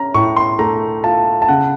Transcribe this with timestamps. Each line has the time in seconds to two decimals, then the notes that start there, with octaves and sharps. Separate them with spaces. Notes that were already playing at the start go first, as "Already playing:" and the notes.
Already playing: C#4 A#5
0.14 A2 C#6
0.36 C6
0.59 A3 A#5
1.04 F4 A5
1.42 A5
1.49 C#3 F#5